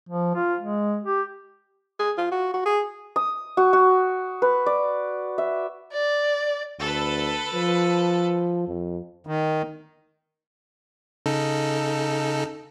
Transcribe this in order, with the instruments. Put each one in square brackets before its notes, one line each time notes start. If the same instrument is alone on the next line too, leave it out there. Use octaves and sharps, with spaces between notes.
[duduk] F3
F4
G#3
G4
[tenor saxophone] G#4
F4
F#4
F#4
G#4
[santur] D#6
F#4
F#4
B4
D5
E5
[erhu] D5
[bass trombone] D2 [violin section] A4 B4
[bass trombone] F3
F2
[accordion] D#3
[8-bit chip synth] C#3 D#4 A4